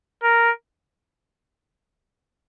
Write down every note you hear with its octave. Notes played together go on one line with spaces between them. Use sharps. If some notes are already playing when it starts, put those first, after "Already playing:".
A#4